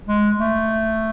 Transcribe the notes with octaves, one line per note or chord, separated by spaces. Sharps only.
G#3
A3